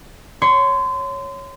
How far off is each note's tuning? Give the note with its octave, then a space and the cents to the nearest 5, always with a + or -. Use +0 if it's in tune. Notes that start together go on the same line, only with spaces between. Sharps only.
C#5 +0 C6 -30